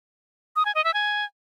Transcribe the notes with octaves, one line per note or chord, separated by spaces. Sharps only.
D#6
G#5
D#5
E5
G#5